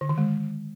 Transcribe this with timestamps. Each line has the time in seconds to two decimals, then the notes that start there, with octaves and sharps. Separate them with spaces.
0.01 D3
0.09 D#3
0.18 G#3